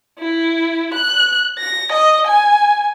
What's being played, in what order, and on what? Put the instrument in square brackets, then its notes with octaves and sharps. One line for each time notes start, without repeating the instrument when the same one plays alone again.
[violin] E4
F#6
A#6
D#5
G#5